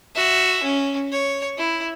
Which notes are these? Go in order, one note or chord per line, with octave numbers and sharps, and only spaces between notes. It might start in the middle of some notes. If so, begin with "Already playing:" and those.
F#4 E5
C#4
C#5
E4